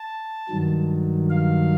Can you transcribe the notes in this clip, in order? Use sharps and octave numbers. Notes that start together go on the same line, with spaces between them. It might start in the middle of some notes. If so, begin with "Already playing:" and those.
Already playing: A5
G2 D#3 F#3
F5